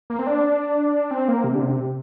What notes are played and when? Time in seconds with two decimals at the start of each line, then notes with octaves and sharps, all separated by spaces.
0.10 A#3
0.19 C4
0.27 D4
1.11 C4
1.28 A#3
1.44 C3
1.55 D3
1.62 C3